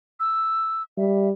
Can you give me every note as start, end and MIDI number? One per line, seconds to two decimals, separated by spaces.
0.20 0.83 88
0.97 1.31 55
0.97 1.28 76